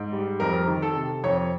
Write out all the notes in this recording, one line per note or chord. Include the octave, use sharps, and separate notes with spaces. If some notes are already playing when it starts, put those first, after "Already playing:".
Already playing: G#2
G3
F2 A#4
D#3
A4
C3
F2 C#5